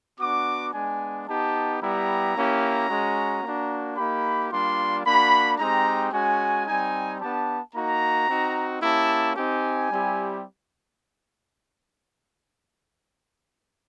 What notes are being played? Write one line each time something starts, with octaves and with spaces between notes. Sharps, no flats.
B3 D4 F#4 D6
G#3 B3 D4 G#5
B3 D#4 G4 A5
G3 B3 E4 G4 A#5
A#3 C#4 E4 G4
G#3 C#4 F#4
A#3 D4 F#4
A#3 D#4 G4 B5
G3 A#3 D4 F4 C6
A#3 D4 F#4 B5
G#3 C4 D#4 G4 A#5
G#3 C#4 F#4 G#5
G3 C4 D#4 G#5
B3 D4 G4 A5
A#3 D#4 F#4 A#5
C4 D#4 F#4
A#3 C#4 E4 G4 A5
C4 D#4 G4 G#5
G3 C4 E4 G4